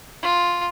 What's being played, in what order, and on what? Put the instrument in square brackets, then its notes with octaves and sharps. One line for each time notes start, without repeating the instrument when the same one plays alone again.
[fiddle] F4